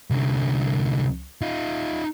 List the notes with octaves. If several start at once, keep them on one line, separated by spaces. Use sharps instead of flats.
C2 D3
D#4 F4